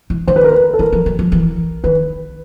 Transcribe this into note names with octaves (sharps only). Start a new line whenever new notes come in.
E3
D#3 C5
B4
A#4
B4
A4
E3 A#4
F3
F#3
F3
E3
D#3 B4